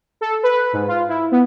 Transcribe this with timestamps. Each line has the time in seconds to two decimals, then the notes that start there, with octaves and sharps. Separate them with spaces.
0.21 A4
0.43 B4
0.73 G#2
0.88 F4
1.09 E4
1.32 B3